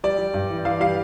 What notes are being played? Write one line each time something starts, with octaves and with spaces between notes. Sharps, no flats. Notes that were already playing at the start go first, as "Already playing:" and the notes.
G3 D5
G3
G2
E3
E3 F5
G3 F5